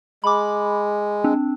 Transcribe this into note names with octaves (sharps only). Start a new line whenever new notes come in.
G#3 B5 D6
C4 D4